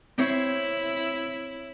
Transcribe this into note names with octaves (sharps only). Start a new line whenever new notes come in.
C4 E4 C5 C#5